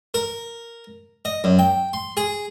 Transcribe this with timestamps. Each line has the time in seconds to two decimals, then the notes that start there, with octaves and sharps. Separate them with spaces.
0.14 A#4
1.25 D#5
1.44 F#2
1.59 G5
1.93 C6
2.17 G#4